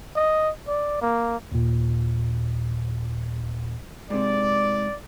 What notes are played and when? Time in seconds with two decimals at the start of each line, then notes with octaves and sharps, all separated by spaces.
0.16 D#5
0.68 D5
1.01 A#3
1.52 D#2 A#2
4.10 G#2 C3 D5